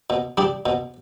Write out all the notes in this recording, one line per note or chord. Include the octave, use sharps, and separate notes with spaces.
B2
G3 D4 G4
B2